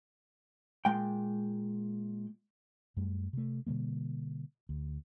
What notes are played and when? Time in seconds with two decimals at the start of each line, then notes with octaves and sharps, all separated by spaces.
0.85 A#2 G#3 G5
2.97 F#2 G3 A3
3.33 C3 A3
3.67 B2 D3 G3 A#3
4.69 D2